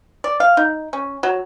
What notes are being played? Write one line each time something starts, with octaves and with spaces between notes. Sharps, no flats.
D5
F5
D#4
C#4
F#3